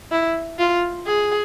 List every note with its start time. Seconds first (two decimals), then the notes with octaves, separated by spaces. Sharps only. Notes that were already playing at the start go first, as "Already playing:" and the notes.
0.11 E4
0.59 F4
1.07 G#4